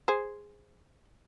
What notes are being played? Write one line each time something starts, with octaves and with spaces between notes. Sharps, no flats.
G#4 C5